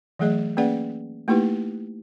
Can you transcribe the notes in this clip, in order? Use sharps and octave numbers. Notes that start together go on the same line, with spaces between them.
E3 F#3 A3 G#4 D#5
A#3 C#4 G#4 B4 D5 F#5
A3 A#3 D#4 E4 G4 B4